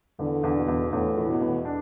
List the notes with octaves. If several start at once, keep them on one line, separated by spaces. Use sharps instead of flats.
E2 D3
E2
B2
E2
E2 A2
E3
B2
E2
D4